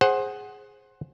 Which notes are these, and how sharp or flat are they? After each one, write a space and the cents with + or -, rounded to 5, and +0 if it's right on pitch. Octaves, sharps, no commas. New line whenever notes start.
G#4 +0 C5 +20 F#5 +10